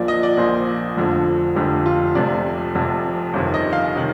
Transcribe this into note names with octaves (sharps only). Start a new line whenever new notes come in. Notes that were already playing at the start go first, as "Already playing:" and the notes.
Already playing: A#1 A#2 F3 D5
D#5
D5
A#1 A#2 F3 C5
F1 F2 D3 F3
F1 F2 D3 F3 G4
F4
F1 F2 C3 D5
F1 F2 C3
G1 F2 C3 D#3
D#5
F5
C3 D#3